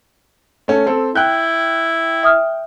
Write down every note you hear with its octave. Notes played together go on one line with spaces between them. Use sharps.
A3 C#4 A4
C4 A4
E4 G5 F#6 G6
E5 D#6 F6